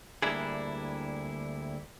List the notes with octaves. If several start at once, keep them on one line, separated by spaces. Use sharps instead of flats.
D2 G3 A#3 D4 E4 G#4